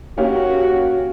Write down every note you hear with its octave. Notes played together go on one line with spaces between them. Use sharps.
A#3 C#4 F#4 G4